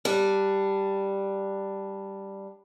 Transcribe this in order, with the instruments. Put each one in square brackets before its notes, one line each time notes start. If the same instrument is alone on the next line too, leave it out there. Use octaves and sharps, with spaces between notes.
[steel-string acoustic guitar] G3 D4